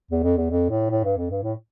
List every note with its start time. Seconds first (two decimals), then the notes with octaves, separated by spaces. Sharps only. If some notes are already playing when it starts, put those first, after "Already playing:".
0.11 E2
0.24 F2
0.37 E2
0.51 F2
0.70 A2
0.91 A2
1.04 G2
1.18 F2
1.30 G2
1.43 A2